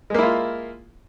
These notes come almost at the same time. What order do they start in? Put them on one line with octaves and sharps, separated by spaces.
G#3 A#3 E4 F4